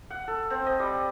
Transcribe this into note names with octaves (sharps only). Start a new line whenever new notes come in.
F#5
A4
C4
D#5
G3